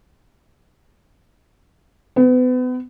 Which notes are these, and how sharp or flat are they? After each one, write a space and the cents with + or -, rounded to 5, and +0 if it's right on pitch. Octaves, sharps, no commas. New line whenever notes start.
B3 +35